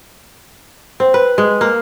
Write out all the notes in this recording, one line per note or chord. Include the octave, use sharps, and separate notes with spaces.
C4
B4
G#3
A#3